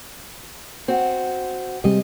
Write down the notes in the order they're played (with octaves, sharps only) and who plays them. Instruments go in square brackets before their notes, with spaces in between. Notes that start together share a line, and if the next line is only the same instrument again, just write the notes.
[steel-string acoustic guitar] C4 F#4
[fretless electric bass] C3 G3 G#3 [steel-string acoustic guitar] D#5